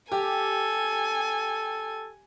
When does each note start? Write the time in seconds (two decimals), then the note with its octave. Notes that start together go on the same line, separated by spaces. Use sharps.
0.11 G4 A4 G#5